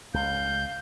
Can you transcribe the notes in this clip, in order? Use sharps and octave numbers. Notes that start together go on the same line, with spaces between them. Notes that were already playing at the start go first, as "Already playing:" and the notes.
C#2 F5 G6